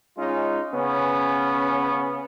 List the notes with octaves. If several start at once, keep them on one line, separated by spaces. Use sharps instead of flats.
G#3 C#4 D#4 F4
C#3 B3 C#4